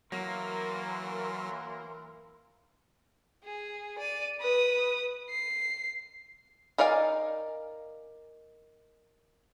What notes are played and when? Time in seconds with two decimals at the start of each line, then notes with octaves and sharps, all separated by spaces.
0.12 E3 F#3 A#3 A#4 C6
3.44 G#4
3.99 D5 D#7
4.41 B4 D#6
5.29 C7
6.78 D#4 A#4 D5 F5 G#5